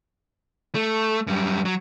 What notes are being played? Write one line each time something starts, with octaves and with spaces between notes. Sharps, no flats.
A3
F#2 G3
F#3